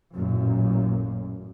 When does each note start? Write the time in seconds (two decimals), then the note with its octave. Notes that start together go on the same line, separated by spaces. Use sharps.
0.13 A1 F#2 A#2